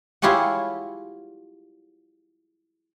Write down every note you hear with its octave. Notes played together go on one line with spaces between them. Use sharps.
E4 F4 G4 G#4 C#5 F#5